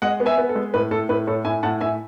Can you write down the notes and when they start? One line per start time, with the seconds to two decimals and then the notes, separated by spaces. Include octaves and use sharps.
0.02 G#3 D#5 F#5
0.20 B3
0.26 E5 G#5
0.38 B3
0.49 A4
0.56 G#3
0.74 A2 B4
0.91 A2 A4
1.09 A2 B4
1.27 A2 A4 C#5
1.45 A2 E5 G#5
1.63 A2 F#5 A5
1.81 A2 E5 G#5